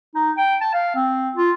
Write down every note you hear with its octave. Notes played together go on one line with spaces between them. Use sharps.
D#4
G5
A5
F5
C4
F4